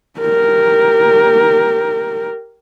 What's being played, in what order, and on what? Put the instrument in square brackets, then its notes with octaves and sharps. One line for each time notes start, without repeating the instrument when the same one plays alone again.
[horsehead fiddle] G4 A#4